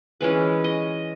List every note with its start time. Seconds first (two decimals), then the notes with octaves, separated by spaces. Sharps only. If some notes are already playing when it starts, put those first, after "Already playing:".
0.21 E3 G#3 C#4 B4
0.64 D#5